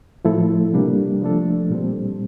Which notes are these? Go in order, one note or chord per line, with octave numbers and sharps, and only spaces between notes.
A2 F3 A3 E4 A4
C3 G3 A#3 D4
F3 A3 D4 A4
A#2 G3 C4